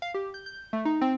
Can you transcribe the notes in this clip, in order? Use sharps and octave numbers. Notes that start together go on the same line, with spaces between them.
F5
G4
G6
G6
A3
D#4
C4